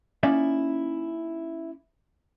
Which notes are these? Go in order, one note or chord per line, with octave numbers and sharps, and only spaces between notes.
A#3 C#4 D#4 E4 D5 E5